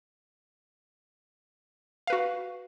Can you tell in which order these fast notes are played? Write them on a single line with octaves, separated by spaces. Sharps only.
F5 B4 F#4